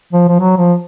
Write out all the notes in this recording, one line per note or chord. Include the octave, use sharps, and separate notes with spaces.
F3
F3
F#3
F3